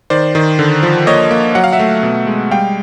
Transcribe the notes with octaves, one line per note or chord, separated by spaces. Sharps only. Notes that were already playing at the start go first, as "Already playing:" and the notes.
D#3 C5 D5
D#3
D3
F3
A#3 C#5 D#5
A#3
F#3 F#5
F5
E5 F#5
A3
B2
G#3
G3 F5 G5